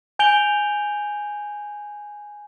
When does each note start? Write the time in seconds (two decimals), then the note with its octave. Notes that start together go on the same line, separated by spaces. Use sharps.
0.19 G#5 G6 D7 F7 G7